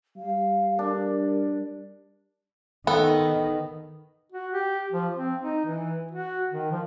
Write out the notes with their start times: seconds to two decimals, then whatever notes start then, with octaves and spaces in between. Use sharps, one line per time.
0.17 G3 F5
0.79 D4 A#4
2.87 D#3 B3 A4
4.32 F#4
4.53 G4
4.92 F3
5.17 C4
5.40 D#4
5.65 E3
6.11 F#4
6.51 D#3
6.72 F3